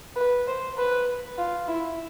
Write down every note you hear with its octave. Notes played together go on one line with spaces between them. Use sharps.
B4
C5
B4
F4
E4